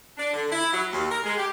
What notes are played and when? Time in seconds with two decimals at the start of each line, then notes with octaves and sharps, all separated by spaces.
0.17 D4
0.34 D3
0.51 E4
0.72 F#3
0.91 D#2
1.11 A#4
1.23 G#3
1.37 G4